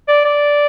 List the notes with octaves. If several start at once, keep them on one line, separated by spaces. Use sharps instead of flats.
D5
D5